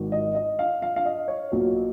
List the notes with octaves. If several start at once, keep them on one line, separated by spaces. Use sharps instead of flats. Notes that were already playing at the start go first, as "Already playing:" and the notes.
Already playing: G#1 G#2 D#3 F#3
D#5
D#5
F5
F5
F5
D#5
C#5
B1 A#2 F#3